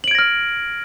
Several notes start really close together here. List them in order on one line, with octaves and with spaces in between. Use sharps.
F#7 D7 G#6 A#6 F6